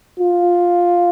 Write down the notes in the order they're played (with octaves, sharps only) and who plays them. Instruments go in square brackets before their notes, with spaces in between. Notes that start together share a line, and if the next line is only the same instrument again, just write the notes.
[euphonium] F4